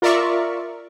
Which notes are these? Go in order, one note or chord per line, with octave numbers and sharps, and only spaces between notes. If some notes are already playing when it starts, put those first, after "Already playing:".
F4 A#4 D5 E5 C#6